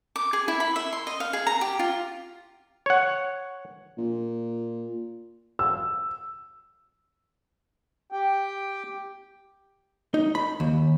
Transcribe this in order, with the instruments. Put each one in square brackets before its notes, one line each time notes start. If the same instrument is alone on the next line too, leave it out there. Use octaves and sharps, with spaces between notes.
[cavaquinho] D6
G#4
E4
B5
E5
C6
D#5
F5
G#4
A#5
G4
F4
[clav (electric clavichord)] C#5 F#5
[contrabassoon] A#2
[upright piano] E6
[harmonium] G4 G5
[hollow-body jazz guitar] D#4
B5
D#2